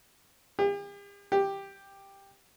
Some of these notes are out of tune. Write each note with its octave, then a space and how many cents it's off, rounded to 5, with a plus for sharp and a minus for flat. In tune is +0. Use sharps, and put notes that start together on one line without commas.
G4 +45
G4 +5